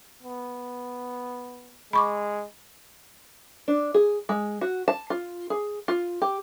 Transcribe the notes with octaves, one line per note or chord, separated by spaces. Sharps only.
B3
G#3 B5 C#6 D6
D4
G#4
G#3
F#4
A5
F4
G#4
F4
G4